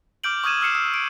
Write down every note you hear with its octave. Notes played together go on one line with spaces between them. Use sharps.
D6 F6 G6 D7 F#7
C#6 D#6 F6 G#6 D#7 E7
E6 F6 C7 C#7 E7 F#7
E6
D7